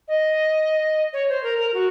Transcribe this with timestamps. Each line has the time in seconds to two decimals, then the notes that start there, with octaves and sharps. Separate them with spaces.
0.08 D#5
1.13 C#5
1.29 C5
1.43 A#4
1.59 A#4
1.74 F#4